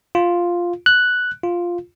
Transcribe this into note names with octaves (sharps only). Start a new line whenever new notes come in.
F4
F#6
F4